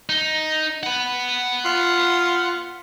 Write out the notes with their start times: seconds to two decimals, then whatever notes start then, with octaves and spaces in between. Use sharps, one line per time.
0.09 D#4
0.83 F#5 B5
1.65 F4